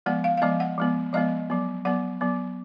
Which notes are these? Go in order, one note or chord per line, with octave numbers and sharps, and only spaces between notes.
F3 G#3 B3 F#5
F5
F5
F3 G#3 B3 D#5
F#5
F3 G#3 B3
F3 G#3 B3 D#5
F#3 B3
F#3 B3 F#5
F#3 B3